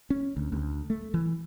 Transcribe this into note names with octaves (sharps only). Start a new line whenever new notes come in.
C#4
D2
D2
A3
E3